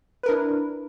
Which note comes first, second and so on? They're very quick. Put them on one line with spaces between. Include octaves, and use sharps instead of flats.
B4 A#4 D4 E4